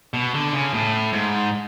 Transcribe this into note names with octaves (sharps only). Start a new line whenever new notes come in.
B2
D3
C#3
A2
G#2